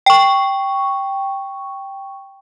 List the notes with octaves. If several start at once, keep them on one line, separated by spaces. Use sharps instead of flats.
G5 C#6